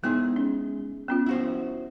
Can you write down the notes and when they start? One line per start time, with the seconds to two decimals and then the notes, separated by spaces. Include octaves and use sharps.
0.04 G#3 B3 D#4 E4 G#4
0.36 C#4
1.08 B3 C#4 F4
1.26 E4 F#4 C5